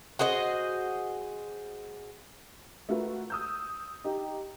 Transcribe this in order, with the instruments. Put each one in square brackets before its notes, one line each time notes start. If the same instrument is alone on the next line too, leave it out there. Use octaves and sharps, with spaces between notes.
[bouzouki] F#4 G#4 C5 D#5
[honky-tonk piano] A3 F4 F#4 A#4 B4
D#6 E6 G6
D#4 G4